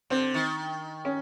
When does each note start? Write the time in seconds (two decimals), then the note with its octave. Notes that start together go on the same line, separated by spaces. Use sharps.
0.10 D3 C4
0.34 D#3
1.05 C#4